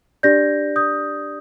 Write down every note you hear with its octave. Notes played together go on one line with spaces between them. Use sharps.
D4 G4 D5 G6 A#6
D#6 G6